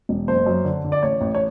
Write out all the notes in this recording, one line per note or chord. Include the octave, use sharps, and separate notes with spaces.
E1
F#1 C5
F#2
D3
D3
D5
A1 C#5
A1
C#5